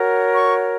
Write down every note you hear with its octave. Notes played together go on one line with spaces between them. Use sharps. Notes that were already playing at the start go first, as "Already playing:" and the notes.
Already playing: F#4 A#4 C#5
C#6